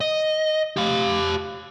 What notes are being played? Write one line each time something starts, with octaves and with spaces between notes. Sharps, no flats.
D#5
G4 F5